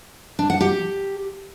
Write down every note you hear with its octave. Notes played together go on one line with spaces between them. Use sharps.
D4
F#5
G4